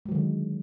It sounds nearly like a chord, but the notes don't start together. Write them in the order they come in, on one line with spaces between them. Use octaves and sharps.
G#3 F#3 D#3 D3